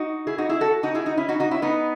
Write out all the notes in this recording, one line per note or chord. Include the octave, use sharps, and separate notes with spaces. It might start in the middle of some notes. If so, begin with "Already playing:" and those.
Already playing: D#4 F#4
E4 G#4
D#4 F#4
E4 G#4
F#4 A4
D#4 F#4
E4 G#4
D#4 F#4
C#4 E4
D#4 F#4
D#4 F#4
C#4 E4
B3 D#4